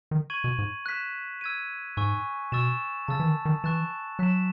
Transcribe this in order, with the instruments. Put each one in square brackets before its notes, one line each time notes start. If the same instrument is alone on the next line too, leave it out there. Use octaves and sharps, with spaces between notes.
[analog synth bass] D#3
[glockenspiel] C#6 G#6 D#7 F#7
[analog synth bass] B2
G#2
[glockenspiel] F#6 B6 E7
E6 G#6 D#7
[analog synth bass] G#2 [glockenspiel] G#5 C#6 E6
[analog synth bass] B2 [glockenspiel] C#6 E6 A6 E7
[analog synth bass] C#3 [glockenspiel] A5 E6 A6
[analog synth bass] E3
D#3
D#3
[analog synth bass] E3 [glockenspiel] C#6 F#6 A6 E7
[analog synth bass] F#3 [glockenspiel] F#6 B6 E7